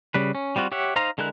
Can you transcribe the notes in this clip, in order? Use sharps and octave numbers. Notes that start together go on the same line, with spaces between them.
C#3 G3 B4
C#4
G3 C4 F4 F#4
G4 C#5 E5 F#5
D#4 C5 F5 A#5
D3 G#3 E4 A#4 F#6